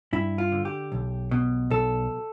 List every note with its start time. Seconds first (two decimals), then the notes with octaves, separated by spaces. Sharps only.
0.13 G2 E4
0.38 F4
0.52 D3
0.65 G4
0.92 B1
1.31 B2
1.70 B1 A4